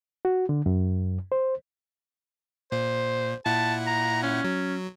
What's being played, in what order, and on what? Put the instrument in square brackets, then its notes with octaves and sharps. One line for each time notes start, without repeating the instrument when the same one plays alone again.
[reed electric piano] F#4
D3
F#2
C5
[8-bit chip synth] A#2 [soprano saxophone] C5
[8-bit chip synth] A#2 E4 F#5 [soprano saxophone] A5
[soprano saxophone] A#5
C#4
[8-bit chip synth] F#3